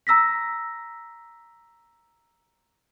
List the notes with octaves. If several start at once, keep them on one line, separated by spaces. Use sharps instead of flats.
A#5 E6 A#6 B6